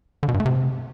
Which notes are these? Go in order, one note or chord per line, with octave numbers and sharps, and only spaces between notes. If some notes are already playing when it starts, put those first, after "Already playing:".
D3
B2
G2
A3
C3